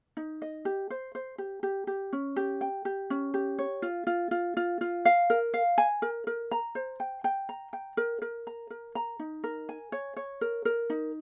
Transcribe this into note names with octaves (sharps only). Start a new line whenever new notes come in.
D#4
D#5
G4
C5
C5
G4
G4
G4
C#4
G4
G5
G4
C#4
G4
C#5
F4
F4
F4
F4
F4
F5
A#4
F5
G#5
A#4
A#4
A#5
C5
G5
G5
A#5
G5
A#4
A#4
A#5
A#4
A#5
D#4
A#4
G#5
C#5
C#5
A#4
A#4
D#4